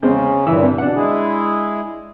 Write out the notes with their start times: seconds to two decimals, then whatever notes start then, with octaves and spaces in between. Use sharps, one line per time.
0.03 E2 C#3 G#3 C4 C#4
0.46 G2 A#2 E3 E4 E6
0.63 C3
0.78 B2 D4 F#5
0.96 G#3 E4 G#4